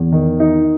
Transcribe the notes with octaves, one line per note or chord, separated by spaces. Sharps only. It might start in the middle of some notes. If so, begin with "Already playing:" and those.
Already playing: E2
D#3
D#4